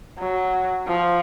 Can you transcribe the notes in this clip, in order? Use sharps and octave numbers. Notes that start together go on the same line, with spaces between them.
F#3
F3